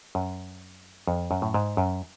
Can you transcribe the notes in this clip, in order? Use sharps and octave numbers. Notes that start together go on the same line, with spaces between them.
F#2
F2
F#2
A2
G#2
F#2